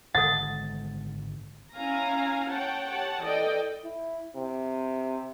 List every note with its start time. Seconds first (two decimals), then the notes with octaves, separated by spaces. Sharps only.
0.14 G#1 D3 G#3 A4 F#5 A6
1.76 C#4 E4 F5 G#5 A#5
2.49 C#5 F#5 G5 A5
2.89 G4 C#5 F#5 A5
3.23 E3 A4 D5 D#5 G5
3.84 E4
4.36 C3